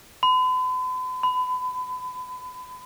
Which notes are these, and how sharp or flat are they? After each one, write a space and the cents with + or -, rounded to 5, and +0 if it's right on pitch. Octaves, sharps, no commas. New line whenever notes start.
B5 +45
B5 +30